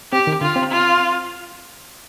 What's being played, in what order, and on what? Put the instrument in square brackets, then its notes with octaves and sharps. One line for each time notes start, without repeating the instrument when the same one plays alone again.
[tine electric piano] C4 [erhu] G4
[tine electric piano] D#3
[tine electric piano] D3 [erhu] F4
[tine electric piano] C4
[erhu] F4